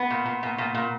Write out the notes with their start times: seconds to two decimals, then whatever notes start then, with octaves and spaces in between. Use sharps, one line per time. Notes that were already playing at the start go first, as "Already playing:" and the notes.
Already playing: B3
0.10 A#2
0.26 A#2
0.43 A#2
0.58 A#2
0.74 A#2